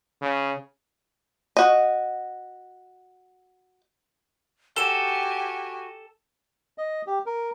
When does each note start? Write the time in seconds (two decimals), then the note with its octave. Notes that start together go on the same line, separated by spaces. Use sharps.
0.22 C#3
1.57 F#4 D#5
4.76 F#4 G4 A4 G#5 E7 G7
6.78 D#5
7.07 G4
7.26 A#4